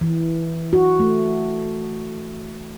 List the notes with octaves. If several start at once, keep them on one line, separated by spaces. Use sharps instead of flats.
E3
F#4
A3